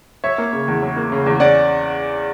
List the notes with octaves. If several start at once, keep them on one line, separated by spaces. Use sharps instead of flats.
F#3 C#5 E5
A#3
C#3
E2
F#3
A#3
C#3
E2
C#4 D5 F#5